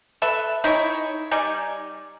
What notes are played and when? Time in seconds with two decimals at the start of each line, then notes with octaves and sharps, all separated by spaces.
0.22 A4 B4 E5
0.64 D#4 E4 G#4 C#5
1.31 G3 D#4 D5 G#5